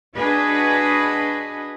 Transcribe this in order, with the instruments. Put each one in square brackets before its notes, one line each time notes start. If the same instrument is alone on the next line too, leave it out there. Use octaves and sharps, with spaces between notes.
[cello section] D4 F#4 G#4 B4 D#5